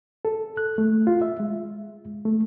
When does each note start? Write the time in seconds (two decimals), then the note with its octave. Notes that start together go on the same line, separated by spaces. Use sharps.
0.25 A4
0.57 F#6
0.78 A3
1.07 F4
1.22 E5
1.40 G#3
2.25 A3